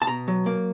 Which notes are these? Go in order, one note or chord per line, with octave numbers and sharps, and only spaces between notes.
A5
B2 A#5
F#3
A#3